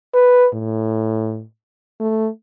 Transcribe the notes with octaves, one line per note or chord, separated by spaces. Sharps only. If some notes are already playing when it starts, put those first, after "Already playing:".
B4
A2
A3